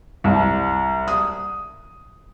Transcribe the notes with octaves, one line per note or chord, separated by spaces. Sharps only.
C2
D#6